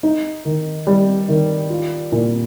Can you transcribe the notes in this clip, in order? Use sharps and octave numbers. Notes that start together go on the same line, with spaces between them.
D#4
D#3
G3
D#3
F4
A#2